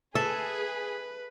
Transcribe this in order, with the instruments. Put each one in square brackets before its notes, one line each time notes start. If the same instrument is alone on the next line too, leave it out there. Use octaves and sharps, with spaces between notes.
[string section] G#4 [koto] A4 [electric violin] B4 [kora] E5